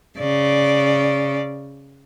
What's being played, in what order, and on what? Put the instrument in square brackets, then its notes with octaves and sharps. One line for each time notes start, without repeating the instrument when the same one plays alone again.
[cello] C#3 D5